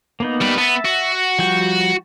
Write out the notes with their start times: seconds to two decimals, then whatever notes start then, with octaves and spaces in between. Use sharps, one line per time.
0.20 A#3 B3 D#4
0.41 G3 B4
0.58 B3 E5 A5
0.85 F#4
1.39 F3 G3 G5